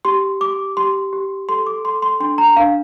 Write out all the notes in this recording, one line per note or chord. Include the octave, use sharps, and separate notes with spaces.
G4 C6
G4 D6
G4 C6
G4
A4 C6
D6
A4 C6
C6
D4 C6
A#5
D4 F5